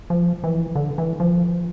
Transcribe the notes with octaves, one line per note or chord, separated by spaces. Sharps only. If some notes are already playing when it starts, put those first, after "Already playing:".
F3
E3
D3
E3
F3